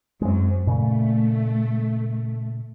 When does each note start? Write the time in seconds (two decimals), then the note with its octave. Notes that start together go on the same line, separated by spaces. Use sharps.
0.22 F#2 G#3 C4
0.67 A#2 C#3 A3